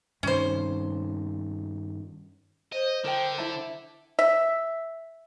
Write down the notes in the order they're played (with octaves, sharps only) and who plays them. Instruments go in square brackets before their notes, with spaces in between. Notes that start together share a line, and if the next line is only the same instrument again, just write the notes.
[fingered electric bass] G2 C3 D#3 [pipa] C#4 C5
[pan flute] C5 [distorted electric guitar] D#5
[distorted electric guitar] D3 [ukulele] A#4 G5
[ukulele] E4 E5 A5
[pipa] E5